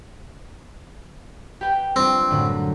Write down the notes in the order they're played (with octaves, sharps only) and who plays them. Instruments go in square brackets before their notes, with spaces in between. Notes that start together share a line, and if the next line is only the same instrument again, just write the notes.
[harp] G4 B4 G5
[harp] G3 D4 F4 [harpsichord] C4
[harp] F#2 A2 D3